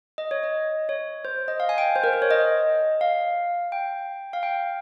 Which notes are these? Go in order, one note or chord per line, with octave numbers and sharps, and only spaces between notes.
D#5
C#5
D#5
C#5
C5
D#5
F5
G#5
G5
C5
A#4
C5
C#5
D#5
F5
G5
F5
G5